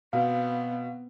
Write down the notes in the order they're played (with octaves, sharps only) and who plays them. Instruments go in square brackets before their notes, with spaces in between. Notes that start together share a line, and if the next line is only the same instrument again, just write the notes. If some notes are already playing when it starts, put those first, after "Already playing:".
[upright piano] B2 [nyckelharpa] B3 C4 [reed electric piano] F5